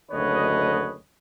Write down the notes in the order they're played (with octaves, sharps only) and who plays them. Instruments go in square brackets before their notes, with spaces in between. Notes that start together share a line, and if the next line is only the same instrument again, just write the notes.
[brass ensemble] F#1 D2 D3 B4 C#5 D#5